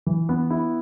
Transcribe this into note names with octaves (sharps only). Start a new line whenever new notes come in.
E3
B3
E4